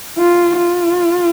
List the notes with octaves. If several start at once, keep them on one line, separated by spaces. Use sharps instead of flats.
F4
F4